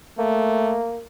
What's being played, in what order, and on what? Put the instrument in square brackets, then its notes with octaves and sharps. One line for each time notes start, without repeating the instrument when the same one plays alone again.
[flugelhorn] A3 [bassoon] A#3